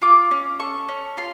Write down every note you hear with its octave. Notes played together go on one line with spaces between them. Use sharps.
F4 D6
C#4
A4 C#6
C#4
F4 C6